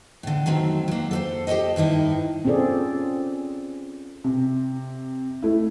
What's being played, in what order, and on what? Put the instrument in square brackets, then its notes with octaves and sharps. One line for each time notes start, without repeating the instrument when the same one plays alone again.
[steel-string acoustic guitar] A2 D3
D#3 F#3 A3 C4
F#3 A#3
A4 B4 C5
G4 A4 B4 C5 D#5
G2 D#3 D#4 E4
[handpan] C4 C#4 F4 G#4 A4 D5
[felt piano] C3
A3 E4